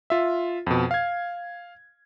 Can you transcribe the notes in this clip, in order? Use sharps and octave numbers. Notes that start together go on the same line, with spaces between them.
F4 E5
F2 B2
F5 G#6